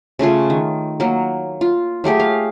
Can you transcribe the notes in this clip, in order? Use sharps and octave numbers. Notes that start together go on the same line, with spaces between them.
C#3 A3 F4 G#4
D#3
F#3 A#3
F4
F#3 A3 G4 G#4
F5